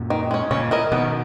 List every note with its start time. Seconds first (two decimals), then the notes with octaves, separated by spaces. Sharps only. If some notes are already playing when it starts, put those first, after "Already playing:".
Already playing: F#2 A#2
0.10 D#3
0.31 G#3 C#4
0.51 A#2 C#3 C#4
0.71 E4 A#4 D#5
0.92 B2 D#3 B3